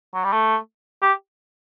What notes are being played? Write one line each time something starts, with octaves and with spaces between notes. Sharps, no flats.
F#3
G3
A3
G4